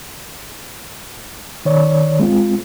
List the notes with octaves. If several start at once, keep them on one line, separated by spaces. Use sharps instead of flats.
D#3 C#5 D5
G#3 C4 F4